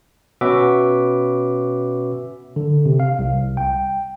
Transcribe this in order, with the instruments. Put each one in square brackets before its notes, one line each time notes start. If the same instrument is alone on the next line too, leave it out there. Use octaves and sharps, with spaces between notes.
[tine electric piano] B2 C#4 F#4 B4 E5 D6
D3
C3
F5
C2
G5